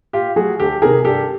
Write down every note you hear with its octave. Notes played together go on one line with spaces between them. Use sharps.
A#2 F4 G4
F#3 A3 F#4 G#4
D2 G4 A4
C3 D#3 G#4 A#4
G2 G4 A4